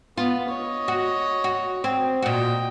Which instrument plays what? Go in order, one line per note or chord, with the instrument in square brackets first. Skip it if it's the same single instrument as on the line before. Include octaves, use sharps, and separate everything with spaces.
[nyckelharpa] B3 [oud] F4
[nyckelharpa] C#5 D#5
[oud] F#4
F#4
C4
[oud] A#2 F#4 [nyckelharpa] D#5 G5